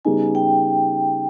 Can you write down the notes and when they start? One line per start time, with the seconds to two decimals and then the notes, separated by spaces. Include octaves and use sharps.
0.05 C#3 G3 B3 D#4 G#4 G#5
0.35 G5